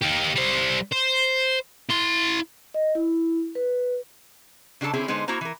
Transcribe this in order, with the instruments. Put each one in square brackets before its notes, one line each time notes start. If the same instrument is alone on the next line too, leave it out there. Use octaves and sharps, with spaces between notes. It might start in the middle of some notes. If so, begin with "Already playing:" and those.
[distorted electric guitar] D#4 G4
G3 C5
C5
E4 C6
[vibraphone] D#5
E4
B4
[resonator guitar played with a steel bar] C#3 D4 G#4 A4 A5
D3 C4 C#4 E4 G#4
D3 G#3 B3 D#4 C5
A#3 E4 F#4 C5 A#5
E3 A#4